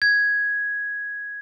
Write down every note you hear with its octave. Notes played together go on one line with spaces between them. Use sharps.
G#6